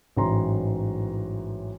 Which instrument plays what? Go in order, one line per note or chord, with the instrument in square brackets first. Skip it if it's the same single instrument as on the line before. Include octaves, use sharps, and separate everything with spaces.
[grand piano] A1 G#2 E3 F#3 A#5 C6